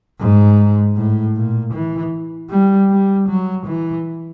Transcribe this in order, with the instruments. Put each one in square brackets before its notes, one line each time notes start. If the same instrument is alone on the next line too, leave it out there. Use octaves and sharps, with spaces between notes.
[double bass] G#2
A2
A#2
E3
G3
G3
F#3
E3